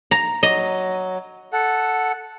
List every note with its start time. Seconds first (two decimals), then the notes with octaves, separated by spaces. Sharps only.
0.11 A#5
0.43 F#3 D#5
1.52 A4 F#5